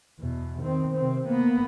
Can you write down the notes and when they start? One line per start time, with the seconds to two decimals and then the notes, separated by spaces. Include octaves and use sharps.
0.20 E2 B2
0.61 D#3 C4
0.96 C3 C4
1.26 A#3 B3